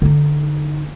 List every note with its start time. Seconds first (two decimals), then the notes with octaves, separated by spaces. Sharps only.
0.02 D3 D#4